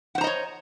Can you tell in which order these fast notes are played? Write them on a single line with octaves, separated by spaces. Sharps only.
F#5 C5 A#5 D#5 C#5